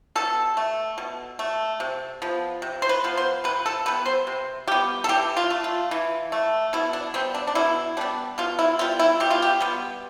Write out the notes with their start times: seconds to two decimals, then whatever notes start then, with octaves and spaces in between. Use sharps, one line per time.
0.15 B2 A4
0.57 A3
0.98 B2
1.39 A3
1.80 C3
2.22 F3 B3
2.62 C3
2.82 C5
2.89 B4
3.04 F3 B3
3.17 C5
3.44 C3 B4
3.66 A4
3.86 G3 B3 B4
4.06 C5
4.27 C3
4.67 G3 B3 G4
5.04 A4
5.09 E3 G4
5.37 F4
5.50 A3
5.64 F4
5.91 E3
6.32 A3
6.73 B2 E4
6.93 D4
7.14 G3 B3 C4
7.34 D4
7.47 D4
7.55 B2 E4
7.97 G3 B3 D4
8.38 B2 F4
8.59 E4
8.79 G3 B3 F4
8.99 E4
9.20 B2 G4
9.31 F4
9.42 G4
9.60 G3 B3